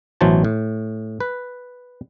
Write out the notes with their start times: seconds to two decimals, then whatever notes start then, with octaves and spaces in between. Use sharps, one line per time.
0.21 A1 B2 E3 F#3 C5 A5
0.44 A2
1.20 B4